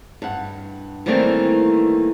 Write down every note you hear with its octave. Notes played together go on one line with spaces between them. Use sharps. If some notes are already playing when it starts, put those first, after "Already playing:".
G2 F#5
D#3 E3 G3 A3 A#3 C4